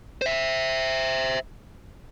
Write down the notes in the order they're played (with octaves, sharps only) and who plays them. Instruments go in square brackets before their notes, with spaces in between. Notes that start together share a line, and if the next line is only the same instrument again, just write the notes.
[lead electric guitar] C5 E5